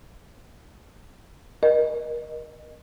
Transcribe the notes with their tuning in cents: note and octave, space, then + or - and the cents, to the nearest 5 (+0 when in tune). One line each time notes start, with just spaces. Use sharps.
A#4 +35 D#5 -15